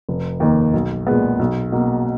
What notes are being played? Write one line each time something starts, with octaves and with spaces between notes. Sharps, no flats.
F1
D#2 D#3 A#3
B1
A#2 G#3 B3
B1
B2 A#3